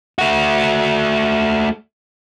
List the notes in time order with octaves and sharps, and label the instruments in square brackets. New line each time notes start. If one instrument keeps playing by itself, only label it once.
[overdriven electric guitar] A3 F#4